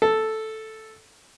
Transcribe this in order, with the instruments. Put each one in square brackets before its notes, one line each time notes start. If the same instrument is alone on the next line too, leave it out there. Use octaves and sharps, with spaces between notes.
[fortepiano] A4